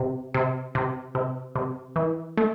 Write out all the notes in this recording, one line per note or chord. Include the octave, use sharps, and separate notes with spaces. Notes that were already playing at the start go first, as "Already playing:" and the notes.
Already playing: C3
C3
C3
C3
C3
E3
A3